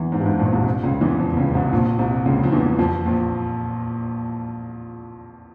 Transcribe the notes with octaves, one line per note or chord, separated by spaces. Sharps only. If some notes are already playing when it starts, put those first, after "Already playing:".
Already playing: E2 E3
G#2
G2
G#2
A#1 A#2
C2 C3
C#2 C#3
E2 E3
F2 F3
C#2 C#3
C2 C3
A#1 A#2
C2 C3
C#2 C#3
F3
E2 E3
F2 F3
A#1 A#2